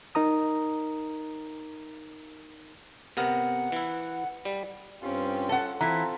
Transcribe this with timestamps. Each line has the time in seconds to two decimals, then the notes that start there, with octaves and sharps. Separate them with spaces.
0.15 D#4 A#4 A#5 D#6
3.17 C3 B3 A#4 F#5
3.72 E3 E4
4.45 G3
5.02 G2 C4 C#4 F4 G4
5.49 A4 F#5
5.81 E3 C4 E4 F4 A4 A#5